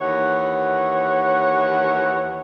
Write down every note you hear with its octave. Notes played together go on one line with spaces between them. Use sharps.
D#2 E3 C#5 F#5